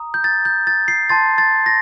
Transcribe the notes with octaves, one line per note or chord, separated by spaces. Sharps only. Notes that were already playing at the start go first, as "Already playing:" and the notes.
Already playing: A#5 D#6
G6
A6
G6
A6
C7
A5 C6 G6 A6
A6
A#6